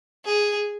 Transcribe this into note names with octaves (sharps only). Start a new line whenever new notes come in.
G#4